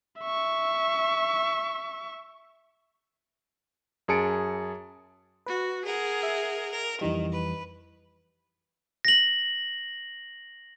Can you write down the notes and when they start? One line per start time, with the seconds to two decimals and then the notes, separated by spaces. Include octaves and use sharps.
0.22 E5 C#6
4.08 F#2 G#4 A5 C#7 D7
5.46 F#4 B4
5.84 G#4 A#4 F#5
6.23 E5
6.70 A#4
7.01 F2 D#3 E3 G3
7.31 B4
9.05 A#6 F#7